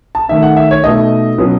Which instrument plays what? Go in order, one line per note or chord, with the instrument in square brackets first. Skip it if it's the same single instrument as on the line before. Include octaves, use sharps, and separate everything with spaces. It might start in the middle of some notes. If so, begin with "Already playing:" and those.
[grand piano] A5
D#3 A3 D#4 E5
F#5
E5
C#5
B2 A3 D#4 D#5
B2 F#3 C#4